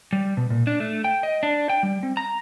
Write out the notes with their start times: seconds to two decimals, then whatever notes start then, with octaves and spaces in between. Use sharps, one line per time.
0.13 G3
0.37 B2
0.50 A#2
0.67 D4
0.80 A3
1.04 G5
1.23 D#5
1.43 D4
1.70 G5
1.83 G3
2.03 C4
2.17 A#5